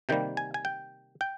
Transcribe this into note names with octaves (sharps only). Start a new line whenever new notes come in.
C3 D#3 G3 A#3 G5
G#5
G#5
G5
G5